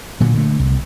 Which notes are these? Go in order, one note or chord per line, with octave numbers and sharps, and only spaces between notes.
A#2 D3 F#3
D3 A3
C2